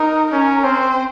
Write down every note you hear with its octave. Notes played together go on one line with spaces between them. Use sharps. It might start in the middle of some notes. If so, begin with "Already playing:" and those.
Already playing: D#4 A#4
C#4 A#4
C4 C5